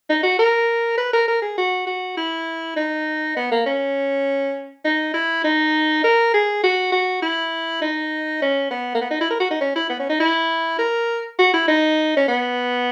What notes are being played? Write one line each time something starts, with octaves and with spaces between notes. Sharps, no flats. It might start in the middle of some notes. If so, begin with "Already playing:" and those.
D#4
F#4
A#4
B4
A#4
A#4
G#4
F#4
F#4
E4
D#4
B3
A#3
C#4
D#4
E4
D#4
A#4
G#4
F#4
F#4
E4
D#4
C#4
B3
A#3
B3
D#4
E4
A#4
F#4
D#4
C#4
E4
B3
C#4
D#4
E4
A#4
F#4
E4
D#4
C#4
B3